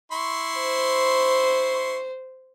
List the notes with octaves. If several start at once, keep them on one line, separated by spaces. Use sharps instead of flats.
E4 C6 C#6
C5